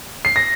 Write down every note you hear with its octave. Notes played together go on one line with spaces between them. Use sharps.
C7
A#6